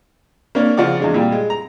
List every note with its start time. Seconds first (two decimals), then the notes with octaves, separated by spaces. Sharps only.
0.55 A#3 C#4 D4
0.77 C#3 F3 D5 F#5 D6
1.00 E2 G#3 D4
1.14 A#2 G3
1.32 G#3
1.50 A#5